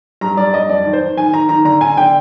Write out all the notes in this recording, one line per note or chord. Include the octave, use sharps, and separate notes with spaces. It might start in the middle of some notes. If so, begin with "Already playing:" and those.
G2 A#5
G2 D5
G2 D#5
F2 D5
D#3
C5
D#3
D#3 G#5
D#3 A#5
D#3 A#5
D3 A#5
D3 G#5
D3 G5